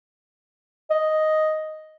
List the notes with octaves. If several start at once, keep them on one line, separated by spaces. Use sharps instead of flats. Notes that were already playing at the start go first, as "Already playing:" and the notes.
D#5